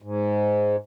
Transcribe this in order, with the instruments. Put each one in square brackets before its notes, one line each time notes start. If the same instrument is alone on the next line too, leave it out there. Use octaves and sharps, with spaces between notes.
[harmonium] G#2